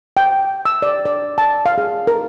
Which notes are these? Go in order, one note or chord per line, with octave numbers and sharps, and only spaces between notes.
G5
E6
D5
D5
A5
F5
G#4
A#4